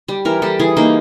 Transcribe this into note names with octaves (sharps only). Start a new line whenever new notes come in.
G3
E3 A#4
G3 A4
E3 G#4
A#3 D#4